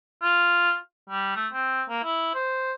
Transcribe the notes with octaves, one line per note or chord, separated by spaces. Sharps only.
F4
G3
A3
C4
A#3
E4
C5